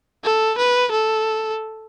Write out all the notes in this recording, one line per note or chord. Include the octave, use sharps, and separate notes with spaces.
A4
B4
A4